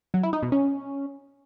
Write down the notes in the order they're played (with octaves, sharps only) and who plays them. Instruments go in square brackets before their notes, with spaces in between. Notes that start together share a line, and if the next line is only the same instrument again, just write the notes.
[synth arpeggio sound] F#3
E4
D#4
B2
C#4